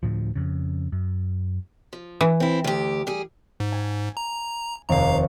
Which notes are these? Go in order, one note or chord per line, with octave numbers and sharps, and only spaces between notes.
D2 A2 F3
F2 C#3
F#2
F3
E3
C4 E4
D2 G4
G3 G#4
G#2
G#5
A#5
F1 D#2 F5 A#5 C#6